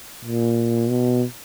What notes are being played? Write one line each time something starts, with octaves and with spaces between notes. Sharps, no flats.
A#2
B2